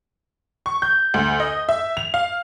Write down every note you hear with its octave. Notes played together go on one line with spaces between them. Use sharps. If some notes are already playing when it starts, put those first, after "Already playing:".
C#6
G6
D2
D#5
E5
F7
F5